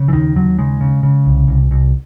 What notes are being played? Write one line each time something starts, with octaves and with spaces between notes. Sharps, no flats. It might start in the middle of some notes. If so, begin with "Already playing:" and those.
Already playing: C#3
E3
D#2 D#3
D#2 F#3
C#3 G#3
C#3
C#3
C2
C2
C2